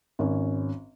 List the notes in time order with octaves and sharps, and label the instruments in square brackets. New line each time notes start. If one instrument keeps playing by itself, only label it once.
[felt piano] G#1 C#4